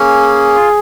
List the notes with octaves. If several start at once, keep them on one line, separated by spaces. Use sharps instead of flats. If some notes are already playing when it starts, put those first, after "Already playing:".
Already playing: A#3 C#4 G#4
F4